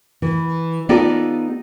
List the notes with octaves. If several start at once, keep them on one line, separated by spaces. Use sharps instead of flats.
E3
B3 D#4 F4 G4 A4 D5